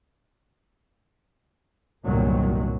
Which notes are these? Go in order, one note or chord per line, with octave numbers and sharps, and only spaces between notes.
G1 C2 A#2 D#3 F#3 A#3